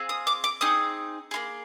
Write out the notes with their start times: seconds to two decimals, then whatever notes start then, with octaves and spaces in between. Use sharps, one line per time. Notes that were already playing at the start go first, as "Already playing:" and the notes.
Already playing: C4 F4 G#4
0.09 D#6
0.27 D6
0.44 D6
0.61 C4 D#4 G#4 D#6
1.31 A#3 F4 G#4